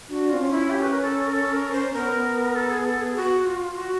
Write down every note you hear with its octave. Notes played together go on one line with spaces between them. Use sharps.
D4 F#4
C4 F4
C#4
E4
G4
B4
A#4
A4
A#4
A4
A#4
C5
B3 A#4
A4
G#4
A4
G#4
F#4
F4
F#4